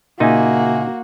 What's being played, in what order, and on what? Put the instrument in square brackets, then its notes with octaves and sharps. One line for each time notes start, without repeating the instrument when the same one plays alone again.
[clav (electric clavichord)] A#2 D#4 [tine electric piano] C#3 E5 G#5 [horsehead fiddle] A#3 F#4